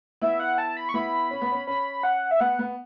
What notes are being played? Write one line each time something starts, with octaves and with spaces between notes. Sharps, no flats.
B3 E4 E5
F#5
A5
B5
C#6
B3 E4 B5
C#4
B3
C#4
C#4 B5
F#5
E5
B3 F#5
B3